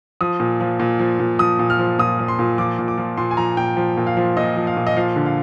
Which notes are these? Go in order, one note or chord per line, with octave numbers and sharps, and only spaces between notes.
F3 D#6
A#2
F3
A#2
F3
A#2
F3 D#6
A#2
F6
F3
A#2 D#6
F3
C6
A#2
F3 D6
A#2
D6
F3
A#2 C6
G#5
F3 A#5
A#2 G5
F3
A#2
F5
F3
A#2 D#5
F3
F5
A#2
D#5
F3 F5
D3
F5